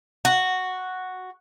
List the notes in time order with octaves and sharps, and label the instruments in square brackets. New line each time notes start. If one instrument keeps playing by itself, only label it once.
[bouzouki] F#4